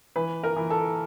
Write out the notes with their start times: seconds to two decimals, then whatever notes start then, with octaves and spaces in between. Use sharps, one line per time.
0.16 E3 B4
0.44 A#4
0.56 E3
0.70 A4